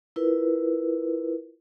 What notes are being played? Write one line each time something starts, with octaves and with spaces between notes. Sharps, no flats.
E4 F4 A#4 B4